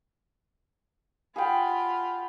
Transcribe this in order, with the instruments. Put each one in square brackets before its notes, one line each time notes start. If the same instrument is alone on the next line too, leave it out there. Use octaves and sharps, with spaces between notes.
[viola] F4 B5 [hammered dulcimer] G#4 F#5 G5